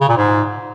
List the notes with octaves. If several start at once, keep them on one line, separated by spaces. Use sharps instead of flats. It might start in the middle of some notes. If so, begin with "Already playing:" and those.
C#3
A#2
G#2